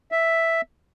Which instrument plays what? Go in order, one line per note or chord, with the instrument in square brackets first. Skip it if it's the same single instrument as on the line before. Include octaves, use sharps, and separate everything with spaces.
[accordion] E5